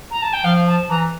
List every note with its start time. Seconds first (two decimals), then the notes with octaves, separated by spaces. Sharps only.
0.11 A#5
0.22 A5
0.33 G5
0.44 F3 F5
0.68 A5
0.89 E3 A#5